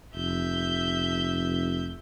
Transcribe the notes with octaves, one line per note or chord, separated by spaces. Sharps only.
F1 E5 G6